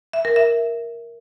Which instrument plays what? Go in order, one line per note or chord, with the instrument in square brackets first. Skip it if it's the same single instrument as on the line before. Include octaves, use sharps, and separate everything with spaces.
[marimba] E5
A#4
E5